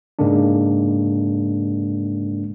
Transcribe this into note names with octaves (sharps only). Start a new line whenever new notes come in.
G#2 C#3 G#3 A#3 D4